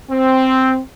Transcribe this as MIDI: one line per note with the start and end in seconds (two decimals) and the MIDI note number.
0.10 0.79 60